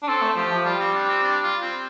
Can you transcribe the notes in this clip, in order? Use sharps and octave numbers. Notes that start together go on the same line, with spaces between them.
D4
C4 A4
A3
F3 G4
F3
G3 F4
C4
D4
C4
D4
F4
C4